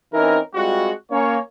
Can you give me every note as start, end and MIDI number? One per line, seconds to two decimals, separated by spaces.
0.14 0.38 52
0.14 0.38 60
0.14 0.38 61
0.14 0.38 63
0.14 0.38 70
0.55 0.91 55
0.55 0.91 56
0.55 0.91 60
0.55 0.91 65
0.55 0.91 66
1.11 1.37 58
1.11 1.37 61
1.11 1.37 73